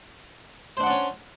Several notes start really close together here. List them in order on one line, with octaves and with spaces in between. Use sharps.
C5 D4 F#5 D5 C#4